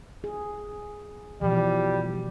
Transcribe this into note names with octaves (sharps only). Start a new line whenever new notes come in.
G#4
B2 E3 F3 G3